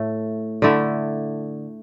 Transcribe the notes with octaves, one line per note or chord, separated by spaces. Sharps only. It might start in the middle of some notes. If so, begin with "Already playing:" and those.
Already playing: A2 A3
D3 A3 E4